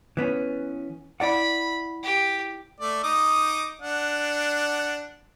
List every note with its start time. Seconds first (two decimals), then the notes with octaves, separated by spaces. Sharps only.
0.17 E3 B3 C#4
1.20 E4 D5 F#5 B5
2.03 G4
2.80 A3 D5
3.04 D#4 D6 D#6
3.82 D4 F#5